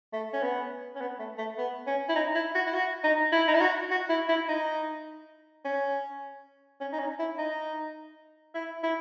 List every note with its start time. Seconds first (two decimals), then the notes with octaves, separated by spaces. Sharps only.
0.13 A3
0.33 C#4
0.43 B3
0.95 C#4
1.01 B3
1.20 A3
1.38 A3
1.58 B3
1.87 C#4
2.09 E4
2.16 D#4
2.35 E4
2.55 F#4
2.66 E4
2.74 F#4
3.04 D#4
3.32 E4
3.48 D#4
3.55 E4
3.61 F#4
3.91 F#4
4.09 E4
4.29 E4
4.49 D#4
5.65 C#4
6.81 C#4
6.93 D#4
6.99 C#4
7.19 E4
7.38 D#4
8.55 E4
8.83 E4